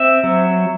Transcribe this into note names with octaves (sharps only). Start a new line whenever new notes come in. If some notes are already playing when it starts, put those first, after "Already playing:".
Already playing: C4 E5
F#3